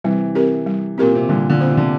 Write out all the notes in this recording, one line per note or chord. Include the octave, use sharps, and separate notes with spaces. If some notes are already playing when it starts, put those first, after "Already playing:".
C3 E3 G3
C4 G4 A#4
G3
A#2 C4 G4 A#4
C3
A#2 D3 G3
A#2 D3
C4 F4 C5
C3
D3